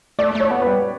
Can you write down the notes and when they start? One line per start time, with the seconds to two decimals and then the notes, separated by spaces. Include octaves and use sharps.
0.19 A3 D5
0.35 A3 C#5
0.51 B3
0.62 B4
0.67 G3